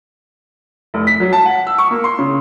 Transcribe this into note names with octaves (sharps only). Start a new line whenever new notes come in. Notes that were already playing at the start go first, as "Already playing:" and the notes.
F1
B6
F#3
A5
F#5
E6
C#6
A#3
C6
C#3